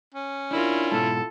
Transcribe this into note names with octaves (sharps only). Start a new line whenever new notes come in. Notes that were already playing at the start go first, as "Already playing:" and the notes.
C#4
D4 E4 F4 A#4
G#2 B2 G#3 A4